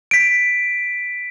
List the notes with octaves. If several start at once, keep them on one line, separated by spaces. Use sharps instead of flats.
B6 D7